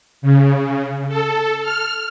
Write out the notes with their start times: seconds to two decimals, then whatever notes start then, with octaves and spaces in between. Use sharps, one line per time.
0.22 C#3
1.08 A4
1.62 F6